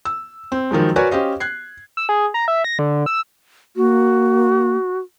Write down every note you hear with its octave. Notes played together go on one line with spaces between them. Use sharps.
E6
C4
D#3 F3 F#3 G#3
F#4 A#4 B4 C#5 D5 G#5
C#4 G4 C5 D#5 F5
F#6 G#6 C7
E6
G#4
A#5
E5
A#6
D3
E6
A#3 F#4